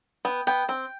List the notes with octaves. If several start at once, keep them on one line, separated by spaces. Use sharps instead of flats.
B3 G5
B3 G5
C4 G5